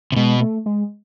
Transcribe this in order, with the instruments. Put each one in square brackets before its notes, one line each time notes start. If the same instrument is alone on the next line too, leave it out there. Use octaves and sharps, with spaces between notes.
[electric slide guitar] C3
[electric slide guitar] B2 [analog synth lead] G#3
[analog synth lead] A3
G#3